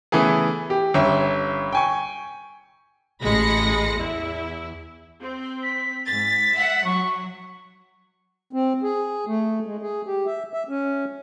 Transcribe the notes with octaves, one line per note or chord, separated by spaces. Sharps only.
C#3 E3 A3 B3 G#4
G4
G1 C#4 G4 E5
G5 G#5 C#6
A1 G#3 B5 A#6 C#7
E2 E4
C4
B6
G#2 A6 B6
E5 F#5
F#3 C#6
C4
G#4
A3
G#3
G#4
G4
E5
E5
C#4